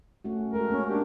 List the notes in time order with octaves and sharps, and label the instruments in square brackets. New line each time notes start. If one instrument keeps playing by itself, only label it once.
[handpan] A3 C#4 F#4
[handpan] G#3 F#4 A4 [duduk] A#4
[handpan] A#3 [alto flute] C#4
[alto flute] D4 [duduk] G4